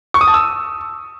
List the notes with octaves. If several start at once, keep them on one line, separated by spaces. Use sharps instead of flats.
C#6
D#6
A5
E6